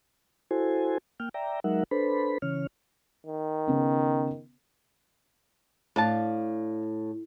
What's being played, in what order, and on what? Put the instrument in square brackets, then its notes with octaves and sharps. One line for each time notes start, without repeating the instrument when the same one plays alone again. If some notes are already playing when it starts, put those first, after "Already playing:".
[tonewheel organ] E4 F#4 A4 C5 G#5
A#3 G5 F6
D5 E5 G5 A#5
F#3 G#3 D#4 A#4 E5 F#5
D4 A4 B4 C5 B5
C#3 E3 C#4 C#5 F6
[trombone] D#3
[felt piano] C#3 B3 C#4
[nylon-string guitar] A2 [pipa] D4 F5 A5